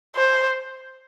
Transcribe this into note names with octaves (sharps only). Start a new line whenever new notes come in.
C5